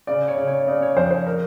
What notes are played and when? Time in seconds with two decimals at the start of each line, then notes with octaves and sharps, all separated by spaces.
0.07 C#3 D5
0.28 C#5
0.37 C#3
0.47 C#5
0.67 C#3 D5
0.82 C#5
0.96 F2 C5
1.11 C5
1.26 A#4